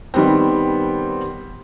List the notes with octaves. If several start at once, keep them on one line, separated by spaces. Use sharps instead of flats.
D#3 G3 B3 C4